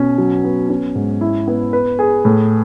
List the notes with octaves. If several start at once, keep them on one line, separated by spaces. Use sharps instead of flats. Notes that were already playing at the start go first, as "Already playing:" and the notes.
Already playing: B2 C#4
F#3
B3
C#4
G#2
E4
B3
B4
G#4
A2